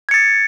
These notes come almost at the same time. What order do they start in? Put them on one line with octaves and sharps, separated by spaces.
G#6 C#7 A6